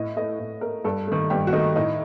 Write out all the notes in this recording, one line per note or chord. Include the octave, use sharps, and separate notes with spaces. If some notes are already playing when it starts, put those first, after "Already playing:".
Already playing: A2 D#5
A3 D#5
A2
A3 A#4
G2 A4
D#3 A3
G2 G4
F#4
D#3 A3 D#4
A2 D#4